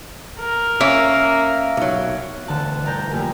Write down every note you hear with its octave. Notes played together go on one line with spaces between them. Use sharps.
A#4
A#3 C#4 E5
B1 F#3
E1 D2 D3 A5 F#6
G1 A#4 D5 A#5 G6 A#6
F2 A3 A#3 G4 A#4 G#5